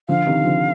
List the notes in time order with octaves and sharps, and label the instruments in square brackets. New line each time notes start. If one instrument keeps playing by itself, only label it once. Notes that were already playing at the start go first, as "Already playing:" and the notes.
[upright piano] D3 F3 [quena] F5
[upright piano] C3 D#3
D3 F3